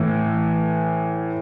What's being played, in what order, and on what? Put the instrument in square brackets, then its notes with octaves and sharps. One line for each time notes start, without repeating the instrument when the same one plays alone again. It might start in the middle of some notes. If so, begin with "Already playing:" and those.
Already playing: [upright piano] A2 E3